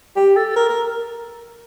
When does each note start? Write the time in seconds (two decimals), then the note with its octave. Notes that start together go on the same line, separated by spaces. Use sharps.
0.16 G4
0.36 A4
0.56 A#4
0.69 A#4